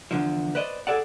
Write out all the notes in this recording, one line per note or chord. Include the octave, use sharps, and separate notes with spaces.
E2 A#2 D3 F3
B4 C5 D5 D#5
G#4 A4 D5 F#5